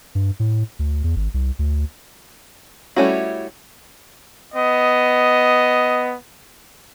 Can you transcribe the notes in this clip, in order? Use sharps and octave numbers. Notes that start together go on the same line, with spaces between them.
G2
A2
D2
E2
G#1
C2
D2
G3 A3 C#4 E4 F#4
B3 D#5